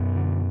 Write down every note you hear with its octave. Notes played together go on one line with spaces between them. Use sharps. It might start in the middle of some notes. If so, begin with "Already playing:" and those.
Already playing: F#2 B2 B3
D3